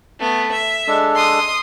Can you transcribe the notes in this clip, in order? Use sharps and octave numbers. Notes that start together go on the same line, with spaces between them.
A3 B3
E5
G#3 D4 A4
C6 D#6